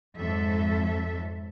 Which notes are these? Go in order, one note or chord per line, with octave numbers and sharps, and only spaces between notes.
F2 G#2 F#3 A4 E5